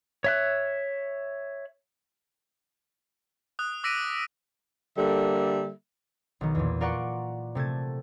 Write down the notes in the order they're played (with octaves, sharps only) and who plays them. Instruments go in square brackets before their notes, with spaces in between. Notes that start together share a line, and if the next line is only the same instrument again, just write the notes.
[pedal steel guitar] C#5 E5 F#6
[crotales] D#6 F#6
D6 E6 A#6 B6 D7 D#7
[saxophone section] D3 G3 A#3 A4 E5
[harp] B1 D#3
E2 A#2
F4 A#4 D5 F#5 C#6
C3 A3 A5 G#6